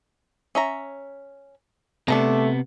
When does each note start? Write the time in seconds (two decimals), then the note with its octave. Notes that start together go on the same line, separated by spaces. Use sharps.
0.55 C#4 E5 A#5
2.08 C3 A3 B3 D4 A4 A#5